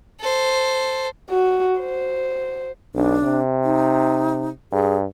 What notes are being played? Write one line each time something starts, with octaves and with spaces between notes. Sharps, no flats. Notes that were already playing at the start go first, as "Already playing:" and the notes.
A4 C5
F#4
C5
B1 D4
C3
D#4
G2 G#4